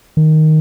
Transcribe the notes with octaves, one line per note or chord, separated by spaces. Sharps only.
D#3